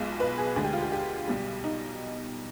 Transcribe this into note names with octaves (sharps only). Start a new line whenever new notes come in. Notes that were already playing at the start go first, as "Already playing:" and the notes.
Already playing: B1 B2 G#3 F4
B4
G#4
D2 D3 G#3 G#4
G4
F4
G4
G4
B1 B2 G3
D#4